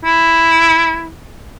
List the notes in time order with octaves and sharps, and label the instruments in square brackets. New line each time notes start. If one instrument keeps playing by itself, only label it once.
[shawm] E4